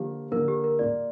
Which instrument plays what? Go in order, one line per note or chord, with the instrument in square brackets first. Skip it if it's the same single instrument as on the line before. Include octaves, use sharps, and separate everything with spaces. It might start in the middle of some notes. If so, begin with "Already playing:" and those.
Already playing: [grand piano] D3 F3 A#3 [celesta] G4
[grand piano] D3 F3 A#3 [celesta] A#4
[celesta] G4
A#4
[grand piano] A#2 A#3 F4 [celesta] D5